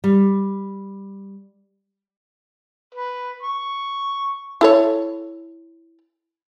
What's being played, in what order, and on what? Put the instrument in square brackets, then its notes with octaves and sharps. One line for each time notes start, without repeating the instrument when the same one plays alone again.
[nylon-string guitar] G3
[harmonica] B4
C#6
[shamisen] E4 A4 C#5